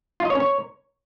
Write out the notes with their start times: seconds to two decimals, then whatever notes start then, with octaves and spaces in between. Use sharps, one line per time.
0.20 F4
0.25 D#5
0.30 C#5
0.35 C#4
0.40 C#5